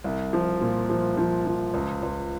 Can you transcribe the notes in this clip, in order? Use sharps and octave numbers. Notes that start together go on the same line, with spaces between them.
C2
F3
A#2
F3
F3
F3
C#2
C#2